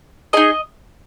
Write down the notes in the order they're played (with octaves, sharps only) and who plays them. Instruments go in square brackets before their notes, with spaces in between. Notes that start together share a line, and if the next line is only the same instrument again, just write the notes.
[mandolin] D#4 G#4 D#5